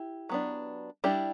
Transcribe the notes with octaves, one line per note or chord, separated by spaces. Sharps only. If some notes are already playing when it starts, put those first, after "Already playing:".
Already playing: E4 G4
F#3 B3 D4
G3 D4 E4 G4